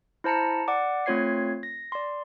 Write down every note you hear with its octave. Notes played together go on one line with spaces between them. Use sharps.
E4 C5 A5 A#5 C#7
D5 F#5 D6
A3 C4 F4 C#5 G#6 C7
A#6
D5 C6